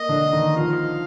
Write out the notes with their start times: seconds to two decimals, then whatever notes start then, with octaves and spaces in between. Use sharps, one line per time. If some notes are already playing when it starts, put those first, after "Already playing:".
Already playing: A#3 D#5
0.09 D3 D4
0.33 D#3 D#4
0.56 F3 F4 F5